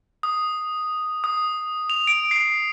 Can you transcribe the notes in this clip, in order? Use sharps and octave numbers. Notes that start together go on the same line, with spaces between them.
D#6
D#6
F7
D7
C7